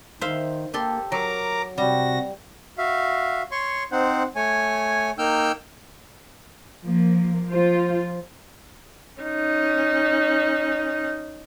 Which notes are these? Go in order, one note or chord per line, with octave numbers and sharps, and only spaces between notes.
D#3 C5 E5 F5
A#3 G4 A4 C6
F#3 A#4 A#5 D6
C3 G3 F#4 A#6
F#4 E5 F5
C#5 C6 C#6
C4 D#4 C5 F#5
A3 C#5 G#5
A#3 D#4 G5 E6 F6 G6
F3 A#3
F3 F4 C5
C#4 D#4